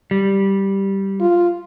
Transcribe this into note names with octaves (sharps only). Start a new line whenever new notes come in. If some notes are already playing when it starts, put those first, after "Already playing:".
G3
F4